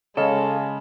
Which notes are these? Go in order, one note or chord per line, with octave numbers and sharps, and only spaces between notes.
C#3 G#3 A4 C#5 D#5 F5